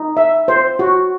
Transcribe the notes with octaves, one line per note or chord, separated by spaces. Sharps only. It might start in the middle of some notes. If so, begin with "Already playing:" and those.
Already playing: D#4
E5
C5
F#4